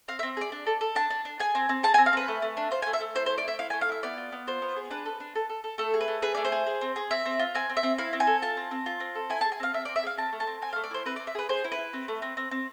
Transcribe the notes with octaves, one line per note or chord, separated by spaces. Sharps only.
C4 F5
E5
C4
G#4 D5
D4
A4
A4
D4 A5
D4
D4
G#4 G#5
C4
C4
G#4 A5
G#5
C4
F5
C4 B4
A3
A3
D4
F4 C5
G#5
A3
E5
A3
E4 C5
C5
A3
D5
E4 E5
E4 F5
G#5
A3
F5
E4 E5
B3 D5
F4
B3
F4 C5
B3
G#4
D4 B4
A4
D4
A4
A4
A4
A3 A4
G#4
B4
A3
G#4 B4
A3 D5
C5
G#4
G#4
C4
G#4
C4 E5
C4
F4
C4 G#5
C4
E5
C4
E4 F5
C4
G#5
A4
F4 A5
C4
C4
F4
C4
A4
E4 G#5
A5
G#4
G#5
C4 F5
C4 E5
D5
C4
E5
G#4 F5
C4 A5
A3
A5
C4
C4 G#5
F5
A3
D5
E4 C5
C4 B4
D5
C4
E5
G#4 B4
G#4 C5
E4
B4
E4
C4
A3
C4
C4
C4